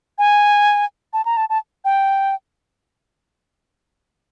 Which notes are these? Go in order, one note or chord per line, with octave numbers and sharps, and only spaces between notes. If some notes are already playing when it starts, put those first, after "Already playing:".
G#5
A5
A#5
A5
A5
G5